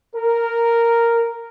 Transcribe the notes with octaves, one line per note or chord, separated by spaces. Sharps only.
A#4